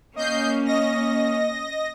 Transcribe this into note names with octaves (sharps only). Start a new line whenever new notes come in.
A#3 C#4 D#5 G6 C7
D#5 A#6